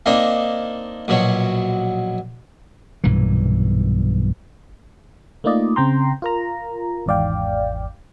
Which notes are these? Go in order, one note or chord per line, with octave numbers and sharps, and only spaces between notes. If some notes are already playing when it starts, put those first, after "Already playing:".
A#3 C4 D4 D#4
A#1 B2 F#3 C#5
B1 G2 A#2 E3
A3 A#3 D#4 F4 D5 D#5
C#3 C4 G5 A#5 C6
F4 A#4 A#5
G#1 E2 G#2 D5 F5 G5